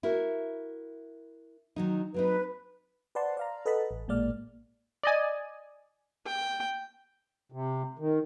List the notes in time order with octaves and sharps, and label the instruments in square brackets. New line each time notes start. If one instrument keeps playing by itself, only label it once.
[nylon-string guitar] E4 F#4 A#4
D#3 F#3 D#4
[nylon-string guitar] F#3 C4 D#4 [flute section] B4
[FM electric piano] B4 C5 D5 F#5 A5 C6
D5 F5 A#5
A4 B4 D#5 F#5 A5 B5
A1
A1 A#2 G#3 A#3 D5 F6
[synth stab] D5 D#5 G#5
[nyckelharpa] G5
[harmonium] C3
D#3